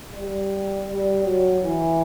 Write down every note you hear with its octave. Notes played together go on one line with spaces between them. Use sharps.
G3
G3
F#3
E3